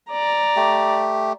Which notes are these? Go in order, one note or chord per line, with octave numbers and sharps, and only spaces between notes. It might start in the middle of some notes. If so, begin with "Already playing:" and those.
D5 A#5
A3 G4